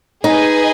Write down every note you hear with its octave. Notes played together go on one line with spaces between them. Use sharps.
D#4 G#4 B4 D#5 G#5